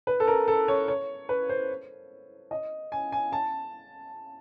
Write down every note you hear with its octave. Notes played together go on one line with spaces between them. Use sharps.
B4
A4
A#4
A4
C#5
C#5
B4
C5
D#5
G#5
G#5
A5